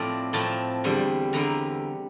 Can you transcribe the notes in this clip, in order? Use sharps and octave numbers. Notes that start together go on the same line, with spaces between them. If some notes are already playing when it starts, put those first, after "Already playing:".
Already playing: A2 F3 C4 D5
A2 F3 C4 A5
E2 D3 G3
E2 D3 G3 A#5